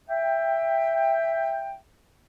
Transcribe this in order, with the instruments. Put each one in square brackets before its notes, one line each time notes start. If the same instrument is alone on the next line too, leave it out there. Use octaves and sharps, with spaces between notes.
[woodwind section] E5 G5